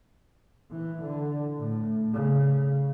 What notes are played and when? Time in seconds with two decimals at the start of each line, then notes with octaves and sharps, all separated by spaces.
0.71 E3
1.02 D3
1.58 A2
2.13 C#3